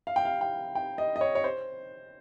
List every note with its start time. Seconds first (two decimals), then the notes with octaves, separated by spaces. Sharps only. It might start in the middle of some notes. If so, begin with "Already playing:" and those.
0.07 F5
0.16 G5
0.25 F5
0.41 G5
0.75 G5
0.98 D#5
1.16 D#5
1.21 C#5
1.35 C#5
1.44 C5